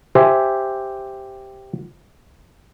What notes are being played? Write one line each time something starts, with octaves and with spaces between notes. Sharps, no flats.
G4 C5 E5 G#5